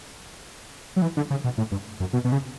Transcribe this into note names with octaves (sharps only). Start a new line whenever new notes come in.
F#3
E3
D3
C#3
B2
A2
G2
F#2
B2
B2
C#3